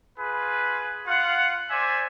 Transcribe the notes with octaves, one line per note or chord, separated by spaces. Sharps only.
F4 G#4 B4
F4 F5 F#5
C5 D5 E5 G#5